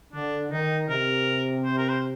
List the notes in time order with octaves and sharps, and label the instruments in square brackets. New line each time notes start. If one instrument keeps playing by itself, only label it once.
[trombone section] D3 [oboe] D4
[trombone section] D#3 [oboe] D#4
[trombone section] C3 [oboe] A#4
[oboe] C5
A#4
C5